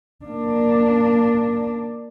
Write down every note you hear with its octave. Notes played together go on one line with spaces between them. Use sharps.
A#3 D4